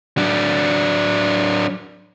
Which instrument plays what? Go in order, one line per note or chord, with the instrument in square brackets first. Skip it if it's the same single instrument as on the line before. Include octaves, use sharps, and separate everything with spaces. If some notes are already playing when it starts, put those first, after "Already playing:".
[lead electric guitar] F#3 D4